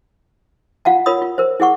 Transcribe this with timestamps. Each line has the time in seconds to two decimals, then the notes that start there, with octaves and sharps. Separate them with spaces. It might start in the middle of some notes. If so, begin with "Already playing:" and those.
0.85 F4 F5 F#5 A5
1.06 F4 A#4 C#5 B5 D#6
1.22 F4
1.38 A#4 C5
1.60 E4 G#4 F#5 C#6